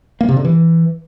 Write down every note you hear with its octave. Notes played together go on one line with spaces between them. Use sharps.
A#3
C3
D3
E3